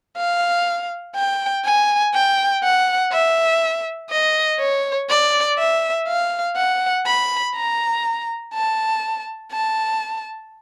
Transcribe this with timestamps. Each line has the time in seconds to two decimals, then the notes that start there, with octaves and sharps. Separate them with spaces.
0.17 F5
1.16 G5
1.65 G#5
2.14 G5
2.64 F#5
3.13 E5
4.11 D#5
4.60 C#5
5.10 D5
5.59 E5
6.08 F5
6.56 F#5
7.06 B5
7.55 A#5
8.54 A5
9.52 A5